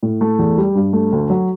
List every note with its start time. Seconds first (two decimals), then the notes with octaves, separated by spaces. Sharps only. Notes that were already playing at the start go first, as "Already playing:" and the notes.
0.03 A2
0.21 A3
0.39 E2
0.58 G3
0.75 G2
0.93 A3
1.12 D2
1.30 F#3